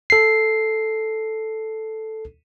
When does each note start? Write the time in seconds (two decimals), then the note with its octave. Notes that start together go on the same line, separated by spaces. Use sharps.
0.10 A4 C7